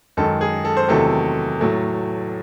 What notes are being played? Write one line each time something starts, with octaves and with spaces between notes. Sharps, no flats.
F#2 D#3 G#3 A4
G#4
A4
C5
E2 C3 D#3 F#3 A3 A4
A2 F#3 A3